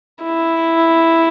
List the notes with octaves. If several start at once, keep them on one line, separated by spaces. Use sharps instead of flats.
E4